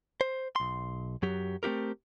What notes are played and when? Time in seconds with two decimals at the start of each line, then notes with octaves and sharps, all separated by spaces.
0.21 C5
0.56 B1 C6
1.22 F#2 F#3 G4
1.63 A3 C4 F#4 G4 A#4